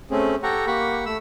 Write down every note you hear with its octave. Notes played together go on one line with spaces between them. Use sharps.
A3 C4 C#4 G#4
G4 A4 F#5 G5 A#5 C#6
A#3 G4 F#5 B5 C#6
A3 B5 E6